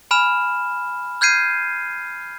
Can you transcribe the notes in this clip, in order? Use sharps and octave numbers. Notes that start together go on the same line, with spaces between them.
G#5 B5 F6 E7
F6 G6 G#6 C7 D#7